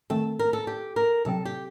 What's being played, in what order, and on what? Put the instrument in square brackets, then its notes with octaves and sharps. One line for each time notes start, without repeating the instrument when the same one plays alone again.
[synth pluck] D#3 A3 C4 [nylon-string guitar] A4
[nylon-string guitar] A#4
A4
G4
A#4
[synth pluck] C3 F#3 C4 [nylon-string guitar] A4
[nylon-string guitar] G4